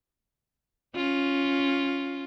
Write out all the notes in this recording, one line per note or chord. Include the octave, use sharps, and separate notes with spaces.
C#4 F4